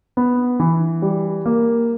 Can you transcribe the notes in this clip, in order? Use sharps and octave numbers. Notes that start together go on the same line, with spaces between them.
B3
E3
G3
A#3